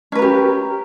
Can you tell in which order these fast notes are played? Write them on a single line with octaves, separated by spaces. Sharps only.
C#4 B4 A#4 G4